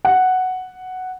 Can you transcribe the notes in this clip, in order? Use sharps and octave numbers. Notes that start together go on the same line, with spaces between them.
F#5